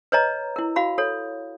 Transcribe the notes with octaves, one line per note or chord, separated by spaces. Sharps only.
B4 C#5 D#5 A#5
E4 A#4
F#4 F5 B5
A4 C#5